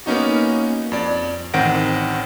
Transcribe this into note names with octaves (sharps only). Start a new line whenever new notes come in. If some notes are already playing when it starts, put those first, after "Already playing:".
A#3 B3 C#4 D#4 F#4
F2 D5
A1 D#3 C4 F#5 A#6 D7